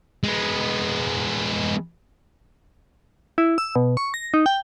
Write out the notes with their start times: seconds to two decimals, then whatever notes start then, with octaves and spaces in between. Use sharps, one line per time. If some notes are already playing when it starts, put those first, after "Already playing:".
0.24 G#3 B3
3.38 E4
3.58 E6
3.76 B2
3.97 C#6
4.14 A#6
4.34 D#4
4.46 G5